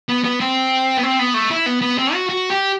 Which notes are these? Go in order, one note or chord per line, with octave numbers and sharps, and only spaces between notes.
B3
B3
C4
B3
C4
B3
A3
E4
B3
B3
C4
F#4
F#4
G4